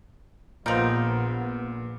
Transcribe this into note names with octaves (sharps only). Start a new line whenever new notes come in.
A#1 A#2 F3 B3 D#4 F6 D7